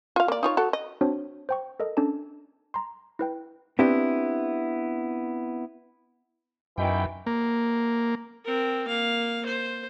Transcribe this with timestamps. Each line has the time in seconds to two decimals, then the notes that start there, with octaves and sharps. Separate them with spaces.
0.16 F4 F5
0.28 A#3 D5
0.43 D#4 F4 C#5
0.57 F#4 A4
0.73 D#5
1.01 C4 D4 F#4 C5 C#5
1.49 C5 G5 C#6
1.80 A4 A#4 D#5
1.97 C#4 D4 A4 A5
2.74 A#5 C6
3.19 E4 B4 G5
3.79 B3 C4 D4 E4 G4
6.78 F#2 B2 D#3 E3 G5
7.27 A#3
8.44 C4 A#4
8.88 A#3 F5
9.46 C5